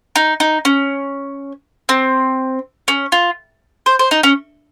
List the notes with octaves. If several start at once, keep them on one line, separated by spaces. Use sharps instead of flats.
D#4
D#4
C#4
C4
C#4
F4
C5
C5
D#4
C#4